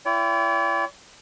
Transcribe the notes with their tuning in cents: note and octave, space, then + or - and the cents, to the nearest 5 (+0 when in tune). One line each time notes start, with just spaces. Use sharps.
E4 +40 D5 -45 G5 +0